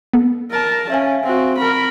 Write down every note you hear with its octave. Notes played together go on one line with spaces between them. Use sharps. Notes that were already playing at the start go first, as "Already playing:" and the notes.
B3 A4
A#4 A5
C#4 E5 F5 G#5
C4 F#4
C4 A#4 B5